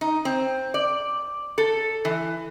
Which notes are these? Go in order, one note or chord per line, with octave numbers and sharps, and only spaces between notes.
D#4
C4
D5
A4
E3